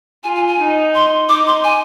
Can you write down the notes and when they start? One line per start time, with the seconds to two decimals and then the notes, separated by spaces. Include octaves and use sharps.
0.24 F4 G#5
0.35 G#5
0.48 G#5
0.59 D#4
0.95 C6
1.29 D#4 D6
1.47 C6
1.64 G#5